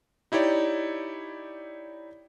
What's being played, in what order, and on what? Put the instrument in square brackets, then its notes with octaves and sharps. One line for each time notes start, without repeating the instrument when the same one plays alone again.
[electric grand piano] D#4 E4 G4 C#5 D5